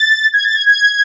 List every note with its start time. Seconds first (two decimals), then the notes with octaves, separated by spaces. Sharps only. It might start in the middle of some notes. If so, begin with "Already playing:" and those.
Already playing: A6
0.33 G#6
0.44 A6
0.55 G#6
0.66 G#6